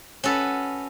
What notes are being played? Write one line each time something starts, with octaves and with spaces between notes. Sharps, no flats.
C#4 F#4 A4 B4